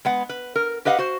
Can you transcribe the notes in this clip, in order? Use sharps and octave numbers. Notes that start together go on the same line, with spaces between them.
G#3 B3 F#5
B4
A#4
G4 B4 D#5 F5 F#5
F#4 C5